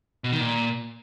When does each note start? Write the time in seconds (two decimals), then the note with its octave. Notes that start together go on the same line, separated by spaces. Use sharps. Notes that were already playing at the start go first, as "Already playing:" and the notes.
0.24 B2
0.32 D#3
0.41 A#2